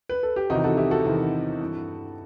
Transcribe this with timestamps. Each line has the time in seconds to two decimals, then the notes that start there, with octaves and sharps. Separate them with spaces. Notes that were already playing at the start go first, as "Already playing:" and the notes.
0.09 B4
0.23 A4
0.36 G4
0.50 E2 C3 D#3 D#4 F#4
0.64 F#4 A4
0.77 E4 G4
0.91 F#4 A4
1.05 E2 C3 D#3
1.60 G2 E3